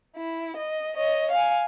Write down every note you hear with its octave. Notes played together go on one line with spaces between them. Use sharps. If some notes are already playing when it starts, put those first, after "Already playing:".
E4
D#5
C#5 D#5
F5 G#5